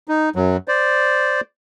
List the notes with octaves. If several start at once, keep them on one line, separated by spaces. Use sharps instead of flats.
D#4
F#2 F#3
C5 D5